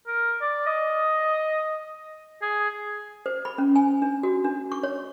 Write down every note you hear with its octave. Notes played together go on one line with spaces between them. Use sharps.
A#4
D5
D#5
G#4
C5
B5
C#4
G#5
D4
F#4
D4
C#6
C#5